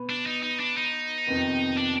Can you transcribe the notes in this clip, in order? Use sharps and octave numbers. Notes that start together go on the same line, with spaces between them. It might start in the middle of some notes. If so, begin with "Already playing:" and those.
Already playing: B2 B3 B4
D4
D#4
D#4
D4
D#4
F2 C3 D#3 B3
D4